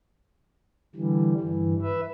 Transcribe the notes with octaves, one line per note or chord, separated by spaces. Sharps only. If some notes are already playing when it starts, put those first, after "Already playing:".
D3 E3 G3
G2 E3
B4 E5